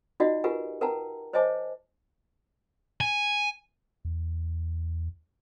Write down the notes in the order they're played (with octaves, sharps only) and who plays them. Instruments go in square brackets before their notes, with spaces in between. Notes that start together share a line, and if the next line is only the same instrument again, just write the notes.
[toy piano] D#4 F4 F#4 D5 D#5 F#5
F4 G4 A#4 B4 F#5 G#5
A#4 B4 F#5 G5 A5 A#5
C5 C#5 D#5 G#5 A5 D6
[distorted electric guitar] G#5
[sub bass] E2